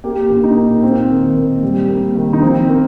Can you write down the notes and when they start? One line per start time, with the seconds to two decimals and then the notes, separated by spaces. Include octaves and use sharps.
0.04 A#3 G4
0.30 A#2
0.44 D#4
0.56 A#3
0.83 A#3 C4
1.10 D#3
1.36 A#3
1.63 G3
1.89 A#3
2.16 D#3
2.33 D#4
2.42 F3 C4
2.69 A#3